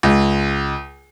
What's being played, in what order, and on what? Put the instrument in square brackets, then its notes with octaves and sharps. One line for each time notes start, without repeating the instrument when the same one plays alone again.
[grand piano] C#2